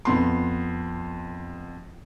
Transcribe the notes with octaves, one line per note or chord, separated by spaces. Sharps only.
F2 B3 C6